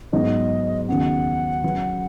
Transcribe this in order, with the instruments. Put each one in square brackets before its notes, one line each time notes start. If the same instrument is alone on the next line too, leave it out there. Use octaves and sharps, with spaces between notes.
[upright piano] G#2 F#3 B3 D#4 [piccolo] D#5
[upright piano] D#2 C#3 B3 F#4 [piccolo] F#5
[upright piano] C#3 F#3 C#4 B4